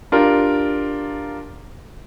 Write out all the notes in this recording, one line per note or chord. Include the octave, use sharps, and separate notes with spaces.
D4 F4 G4 A#4